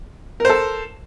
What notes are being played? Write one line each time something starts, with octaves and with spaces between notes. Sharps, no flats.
A4 A#4 C5